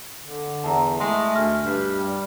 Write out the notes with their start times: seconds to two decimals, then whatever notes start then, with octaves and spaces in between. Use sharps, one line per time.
0.22 D3
0.64 E2 A5 A#5
1.00 G#3 A3 C6
1.36 D2 F6
1.64 G2
1.92 G3